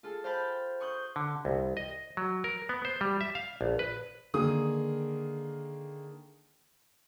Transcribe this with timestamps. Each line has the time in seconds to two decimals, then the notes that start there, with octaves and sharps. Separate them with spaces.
0.03 F4 G#4 A4
0.24 C5 F5 G5 A5 B5
0.80 C6 C#6 D#6 F#6 G6
1.16 D3
1.45 C2
1.77 D#5
2.17 F#3
2.44 A#4
2.69 B3
2.85 C5
3.01 G3
3.21 E5
3.35 F5
3.61 A#1
3.79 B4
4.34 D3 D#3 A#3 G#4 D#6